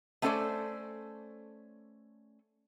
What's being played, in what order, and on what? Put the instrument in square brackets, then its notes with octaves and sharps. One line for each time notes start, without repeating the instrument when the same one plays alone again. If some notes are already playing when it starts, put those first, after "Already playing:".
[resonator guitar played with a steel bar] A3 B3 C#4 A4 C5 D5